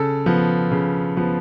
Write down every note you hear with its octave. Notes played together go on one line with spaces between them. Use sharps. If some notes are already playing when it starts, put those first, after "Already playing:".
Already playing: C#3 A4
F3 B3
C#3
F3 B3